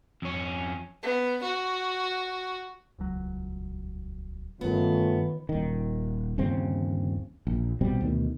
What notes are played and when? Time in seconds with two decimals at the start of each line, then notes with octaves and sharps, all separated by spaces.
0.22 F2 C#4
1.03 B3
1.43 F#4
2.99 D#1 C#2 F#3
4.61 F#1 G2 D#3 A3 B3 C#4 F4
5.49 D#1 D#3
6.38 G1 D#2 C#3 C4
7.47 A#1
7.81 A#1 B2 G3 C4
8.01 D2 B2 D#3